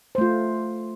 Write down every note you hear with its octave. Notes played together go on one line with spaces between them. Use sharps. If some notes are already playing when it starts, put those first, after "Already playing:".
A3 F4 C5